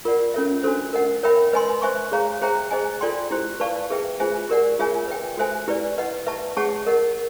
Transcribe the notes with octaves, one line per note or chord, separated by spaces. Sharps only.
F4 A#4 D5 F#5
C#4 F4 A4 C#5 E5
D4 F#4 A4 C5
A#4 D#5 F#5
A#4 C#5 E5 G5 B5
B4 D#5 G#5 C6
C5 E5 G#5 C#6
G#4 C#5 F5 A#5
G#4 C5 E5 G5 A#5
G#4 C5 D#5 G#5
F4 A4 D5 G5 C6
E4 G4 C5
B4 D5 F5 A5 C#6
G#4 B4 E5 G5
F4 G#4 C5 E5 G#5
G4 A#4 D5 F#5
F4 G#4 C#5 E5 G#5
B4 E5 G5
F#4 A4 C5 E5 G#5
E4 G4 B4 D5
B4 D#5 F#5
B4 E5 A5 C#6
G#4 C#5 F#5 A5 C#6
A#4 D#5 F#5